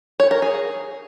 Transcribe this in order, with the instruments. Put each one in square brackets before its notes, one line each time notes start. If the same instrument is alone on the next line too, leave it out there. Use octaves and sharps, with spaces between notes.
[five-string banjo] C#5
A#4
G#4